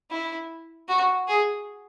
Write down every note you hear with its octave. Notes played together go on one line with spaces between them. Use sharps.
E4
F#4
G#4